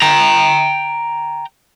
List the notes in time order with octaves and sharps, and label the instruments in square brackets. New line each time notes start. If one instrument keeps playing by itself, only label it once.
[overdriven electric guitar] G5 A#5